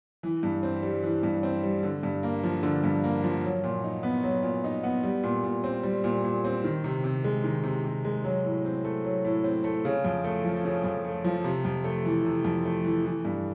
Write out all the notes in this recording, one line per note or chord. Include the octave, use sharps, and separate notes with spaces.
E3
G2
C4
G3
E3
G2
C4
G3
D3
G2
A#3
F3
D3
G2
A#3
F3
F#3
A#2
D#4
B3
F#3
A#2
D#4
B3
G3
A#2
A#2
C4
G3
A#2
A#2
C4
D#3
C3
C3
G#3
D#3
C3
C3
G#3
F#3
A2
C4
A3
F#3
A2
C4
A3
C#3
F2
A3
F3
C#3
F2
A3
F3
C3
F2
A3
E3
C3
F2
A3
E3
E3
G2